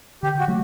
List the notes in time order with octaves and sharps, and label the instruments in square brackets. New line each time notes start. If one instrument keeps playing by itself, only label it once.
[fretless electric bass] D3 [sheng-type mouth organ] G4
[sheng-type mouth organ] F#4
[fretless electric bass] F#3 A3